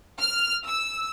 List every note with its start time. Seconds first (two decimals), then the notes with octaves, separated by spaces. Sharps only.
0.19 F6
0.66 E6